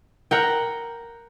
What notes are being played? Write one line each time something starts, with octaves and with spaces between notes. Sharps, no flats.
A#4 F#5 G5